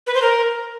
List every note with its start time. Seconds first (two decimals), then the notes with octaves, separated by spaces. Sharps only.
0.07 B4
0.14 C5
0.22 A#4